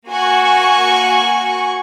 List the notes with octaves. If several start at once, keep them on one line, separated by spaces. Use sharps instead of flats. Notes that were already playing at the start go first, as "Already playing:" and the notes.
A#3 F#4 G#5 C#6